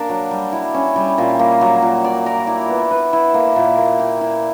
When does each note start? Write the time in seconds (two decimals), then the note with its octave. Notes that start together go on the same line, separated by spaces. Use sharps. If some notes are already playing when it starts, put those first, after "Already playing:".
Already playing: A#3 D4 A#4
0.09 F#3
0.31 G3
0.53 E4
0.74 C#4
0.96 G3
1.18 A#2
1.39 A#3
1.61 F#3
1.82 A#2
2.04 D5
2.26 A#4
2.47 E4
2.69 B3
2.91 B4
3.13 E4
3.34 A#3
3.56 A#2
3.78 A#3
3.99 G4
4.21 E4